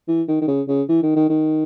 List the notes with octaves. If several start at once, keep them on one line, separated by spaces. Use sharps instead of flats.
E3
D#3
D#3
C#3
C#3
E3
D#3
D#3
D#3